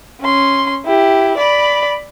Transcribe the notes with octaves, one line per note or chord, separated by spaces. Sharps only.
C#4 C6
E4 G4
D5 B5